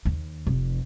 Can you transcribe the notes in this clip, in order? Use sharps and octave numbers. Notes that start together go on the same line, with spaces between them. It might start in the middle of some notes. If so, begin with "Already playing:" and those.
D#2
F1